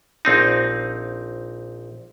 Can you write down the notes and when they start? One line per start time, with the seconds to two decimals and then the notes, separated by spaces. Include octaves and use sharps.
0.25 A#1 C4 D#4